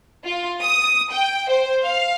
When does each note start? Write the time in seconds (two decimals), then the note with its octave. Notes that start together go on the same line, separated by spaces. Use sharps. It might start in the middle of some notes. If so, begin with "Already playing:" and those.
0.24 F4
0.62 D#6
1.12 G5
1.49 C5
1.83 F5